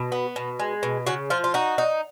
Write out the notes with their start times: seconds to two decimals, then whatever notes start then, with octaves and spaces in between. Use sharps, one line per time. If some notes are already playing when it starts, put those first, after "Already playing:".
Already playing: B2
0.12 B3
0.36 B2
0.59 G#3
0.83 B2
1.06 C#3 F#4
1.30 F3 F4
1.44 F4
1.54 D#4 F#4
1.78 D#4